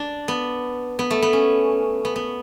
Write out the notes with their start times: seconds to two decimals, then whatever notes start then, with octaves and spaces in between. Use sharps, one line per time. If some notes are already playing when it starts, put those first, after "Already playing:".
Already playing: D4
0.28 B3
0.99 B3
1.11 A3
1.22 B3
1.33 C#4
2.05 B3
2.16 B3